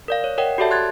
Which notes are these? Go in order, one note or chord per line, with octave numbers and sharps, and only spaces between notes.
A#4 D5 F5
C#5
A#4 C#5 D#5 F#5 G5
F#4 G4 A4 D5 E5 A5
C6 F#6 G#6 A6